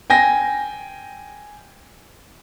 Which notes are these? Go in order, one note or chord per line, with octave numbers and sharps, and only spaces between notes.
G5 G#5 A#6